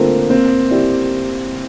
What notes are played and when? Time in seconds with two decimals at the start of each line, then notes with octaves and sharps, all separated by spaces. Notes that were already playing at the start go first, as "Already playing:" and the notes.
Already playing: D3 A3 A#3 C4 F4
0.30 A#3 C4
0.71 E4 G4 D5